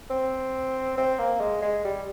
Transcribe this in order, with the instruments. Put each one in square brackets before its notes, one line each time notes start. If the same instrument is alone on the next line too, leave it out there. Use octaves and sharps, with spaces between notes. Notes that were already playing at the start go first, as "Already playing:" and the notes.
[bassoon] C4
C4
A#3
G#3
G#3
G3